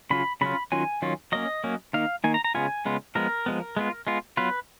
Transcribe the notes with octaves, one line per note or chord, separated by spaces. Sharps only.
C#3 F#3 C#4 F4 B5
C#3 F#3 C#4 F4 B5
D#3 F#3 C#4 F4 G#5
D#3 F#3 C#4 F4
F#3 A#3 C#4 D#5
F#3 A#3 C#4
D#3 A#3 D#4 F5
D#3 A#3 D#4 G#5
A#5
A#5
C#3 G#3 B3 F4 G#5
C#3 G#3 B3 F4
F3 G#3 B3 A#4
F3 G#3 B3
G#3 B3 F4
G#3 B3 F4
F#3 B3 F4 B4